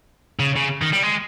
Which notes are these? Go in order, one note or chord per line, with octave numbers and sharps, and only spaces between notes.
C#3
C#3
D#3
G3
G#3